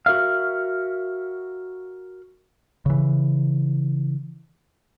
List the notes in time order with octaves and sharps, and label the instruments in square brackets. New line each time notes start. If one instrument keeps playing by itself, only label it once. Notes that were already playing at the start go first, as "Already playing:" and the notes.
[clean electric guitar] F#4 A#4 E5 F5
[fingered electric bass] C#3 E3